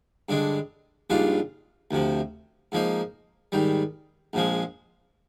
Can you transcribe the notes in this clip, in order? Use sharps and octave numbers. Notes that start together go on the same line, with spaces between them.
G2 D3 G#3 D4
A#1 G#2 G3 D4 F4
D2 C3 F3
G#2 F3 A#3 D#4
G#2 D#3 G3
A#1 A#2 F3 G#3